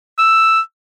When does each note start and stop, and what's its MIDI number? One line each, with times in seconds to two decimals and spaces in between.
0.18 0.60 88